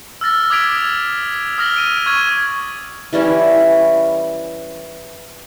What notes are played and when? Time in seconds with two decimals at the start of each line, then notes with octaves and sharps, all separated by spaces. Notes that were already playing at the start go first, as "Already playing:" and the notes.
0.21 E6 F6 A6 A#6
0.50 D6 D#6 G#6 B6 D7 F7
1.58 D#6 F6 A#6 F#7 G7
1.76 D7 D#7
2.06 C#6 F6 G#6 D#7
3.13 E3 G3 C#4 E4